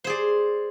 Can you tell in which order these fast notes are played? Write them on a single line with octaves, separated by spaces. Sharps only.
C5 G#4 D5